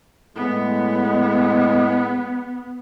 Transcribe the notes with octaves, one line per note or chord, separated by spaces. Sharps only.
A2 G#3 B3